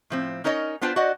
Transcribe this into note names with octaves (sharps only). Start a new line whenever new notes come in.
A2 F3 C4
C#4 D#4 A#4 C#5 D#5
B3 D4 F4 C5 G5 A5
F#4 C5 D5 D#5 F#5